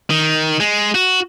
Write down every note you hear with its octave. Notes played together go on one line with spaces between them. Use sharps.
D#3
G#3
F#4